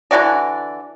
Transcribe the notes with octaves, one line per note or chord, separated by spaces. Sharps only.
D3 E3 F#4 D5